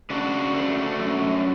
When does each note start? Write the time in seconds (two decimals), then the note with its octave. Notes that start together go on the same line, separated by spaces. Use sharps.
0.10 C#3 D4 F#4
0.54 A3
0.99 F#2